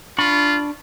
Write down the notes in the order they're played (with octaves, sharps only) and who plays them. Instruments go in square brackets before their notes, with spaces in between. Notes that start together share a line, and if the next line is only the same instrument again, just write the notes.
[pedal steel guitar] D4 B5 C#6 [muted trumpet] F4